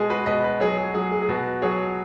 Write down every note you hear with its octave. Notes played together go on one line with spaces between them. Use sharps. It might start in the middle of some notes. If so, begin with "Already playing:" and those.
Already playing: B2 G#3 G#4
F#4 B4
B2 B4 D#5
B4 D#5
F#3 G#4 C#5
G#4
F#3 G#4
G#4
G#4
B2 F#4 B4
F#3 G#4 C#5